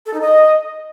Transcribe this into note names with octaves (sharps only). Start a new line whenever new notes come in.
A4
D#4
D#5